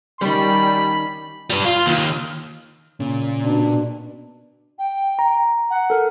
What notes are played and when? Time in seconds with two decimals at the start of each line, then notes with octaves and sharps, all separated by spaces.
0.21 D#3 G3 C#4 B5
1.50 G3 B4
1.65 F4
1.86 D#2 D#3
3.00 A#2 C#3
3.43 B2 D4
4.79 G5
5.19 A#5
5.70 F#5
5.90 A4 A#4